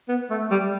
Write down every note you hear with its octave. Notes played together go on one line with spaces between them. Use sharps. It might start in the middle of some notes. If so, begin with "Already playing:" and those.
B3
A3
G3